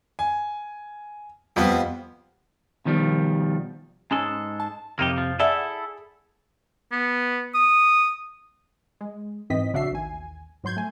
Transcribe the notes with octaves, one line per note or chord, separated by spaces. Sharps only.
G#5
F2 F3 G3 B3
B2 D#3 F3 G3
G#2 G#3 C#4 A4
A5
F2 C3 A#3 D#4 G4
F3
E4 G#4 A4 D5 E5 F#5
B3
D#6
G#3
G#2 E3 C4 D#5 B6
A#1 C#3 D4 F#4 E5 C7
A1 D#2 G#5
G#2 F#3 C6 G6 G#6
A3 G#5